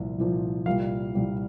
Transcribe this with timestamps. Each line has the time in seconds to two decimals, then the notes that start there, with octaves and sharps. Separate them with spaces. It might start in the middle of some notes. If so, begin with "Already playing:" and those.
Already playing: C2 A#2 F3
0.18 C2 A#2 F3
0.66 C2 A#2 G3 F5
1.15 C2 A#2 G3